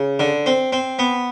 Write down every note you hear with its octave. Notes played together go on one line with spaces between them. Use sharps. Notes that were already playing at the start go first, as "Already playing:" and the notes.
Already playing: C#3
D3
C4
C4
B3